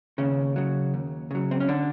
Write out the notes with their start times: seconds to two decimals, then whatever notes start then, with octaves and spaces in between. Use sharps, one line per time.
0.18 D#2 C#3 C#4
0.56 C#3 F#3
0.94 D#2
1.31 C#3 F#3
1.51 C4
1.60 C#4
1.68 D3 D4